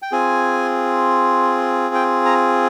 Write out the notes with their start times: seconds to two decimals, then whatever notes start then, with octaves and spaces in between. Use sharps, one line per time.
0.02 G5
0.12 C4 F4 G#4 G#5
1.95 G5
2.25 A#5